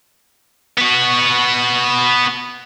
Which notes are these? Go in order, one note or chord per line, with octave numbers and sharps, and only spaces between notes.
B3 F#4